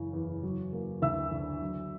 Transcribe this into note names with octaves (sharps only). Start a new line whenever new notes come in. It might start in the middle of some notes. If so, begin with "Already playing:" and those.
Already playing: F#1 C#3 E3
E2
F#3
A#3
D2 E5 E6
D3
F#3